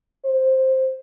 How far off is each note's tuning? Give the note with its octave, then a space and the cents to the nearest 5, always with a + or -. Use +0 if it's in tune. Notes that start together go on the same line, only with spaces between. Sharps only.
C5 +5